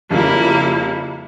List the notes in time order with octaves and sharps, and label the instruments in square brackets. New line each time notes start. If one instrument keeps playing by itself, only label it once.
[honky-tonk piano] F2 C#3 G3 [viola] A#3 E4